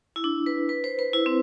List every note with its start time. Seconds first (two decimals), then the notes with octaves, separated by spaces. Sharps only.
0.16 E4
0.24 D4
0.46 B4
0.69 B4
0.84 C5
0.99 B4
1.13 E4
1.26 C4